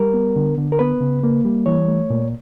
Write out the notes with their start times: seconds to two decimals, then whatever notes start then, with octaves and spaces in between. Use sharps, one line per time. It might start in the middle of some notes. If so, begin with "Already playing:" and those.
Already playing: G3 A#4
0.14 B3
0.36 D3
0.58 D3
0.72 A#4
0.79 B3 B4
1.01 C#3
1.24 A#3
1.45 G3
1.66 E3 C#5
1.88 A3
2.10 A#2